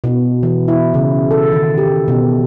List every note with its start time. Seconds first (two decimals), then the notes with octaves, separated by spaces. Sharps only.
0.04 B2
0.43 E3
0.68 E4
0.94 C#3
1.31 A4
1.52 D#3
1.78 G4
2.08 B2